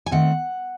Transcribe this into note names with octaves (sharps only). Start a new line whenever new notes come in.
G#5
D#3 A3 C4 F#5